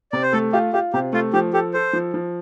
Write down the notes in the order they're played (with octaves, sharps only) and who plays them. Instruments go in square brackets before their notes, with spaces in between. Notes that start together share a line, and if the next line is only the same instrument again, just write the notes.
[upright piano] C3 [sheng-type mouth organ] D5
[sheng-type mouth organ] C5
[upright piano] A3 [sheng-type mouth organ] A4
[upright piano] F4 [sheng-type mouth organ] G4
[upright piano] F4 [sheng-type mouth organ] G4
[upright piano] C3 [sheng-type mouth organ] G4
[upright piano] A3 [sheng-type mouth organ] F4
[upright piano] F3 [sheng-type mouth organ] G4
[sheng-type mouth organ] G4 [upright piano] A4
[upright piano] A4 [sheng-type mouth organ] C5
[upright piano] F3
F3